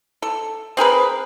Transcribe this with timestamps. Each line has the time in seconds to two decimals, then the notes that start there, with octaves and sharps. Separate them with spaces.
0.22 A4
0.77 C4 G#4 A#4 B4